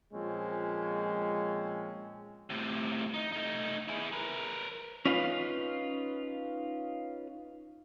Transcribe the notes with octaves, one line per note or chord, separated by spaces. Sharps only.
A#2 F3 G#3 C4 C#4
A2 C3
D#4
A3 D#4
E4 G#4
A#4 B4
C#4 D#4 F4 B4 E5 F5